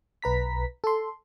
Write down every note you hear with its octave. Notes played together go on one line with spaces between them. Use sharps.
B1 B4 A#5 B6
A4 C6